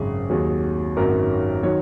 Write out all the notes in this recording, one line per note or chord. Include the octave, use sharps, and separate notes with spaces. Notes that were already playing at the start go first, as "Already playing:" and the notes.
Already playing: G#1 F#2 C#3 G#4
D#2 D#3 F#3 G#4
G#1 F#2 D#3 F#3 A#4
D#3 F#3 C#5